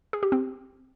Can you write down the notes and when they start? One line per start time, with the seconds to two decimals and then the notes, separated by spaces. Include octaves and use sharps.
0.13 G#4
0.23 G4
0.32 C4